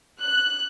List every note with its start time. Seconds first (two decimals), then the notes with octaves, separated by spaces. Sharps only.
0.21 F#6